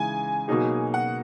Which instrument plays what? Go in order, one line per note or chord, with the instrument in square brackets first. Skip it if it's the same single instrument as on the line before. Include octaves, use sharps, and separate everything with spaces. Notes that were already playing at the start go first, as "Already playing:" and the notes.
Already playing: [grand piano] C#3 E3 G#3 D#4 [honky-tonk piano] G#5
[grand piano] B2 F#3 A#3 D#4 G#4
[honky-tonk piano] F#5